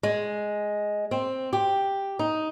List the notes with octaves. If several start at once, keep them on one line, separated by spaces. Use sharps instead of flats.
G#3
C4
G4
D#4